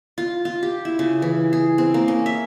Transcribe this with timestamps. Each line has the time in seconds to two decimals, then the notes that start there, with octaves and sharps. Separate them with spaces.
0.18 F4
0.45 F4
0.63 G4
0.85 E4
0.99 C#3
1.22 E3
1.53 G#4
1.78 C4
1.94 A#3
2.08 C#4
2.26 E5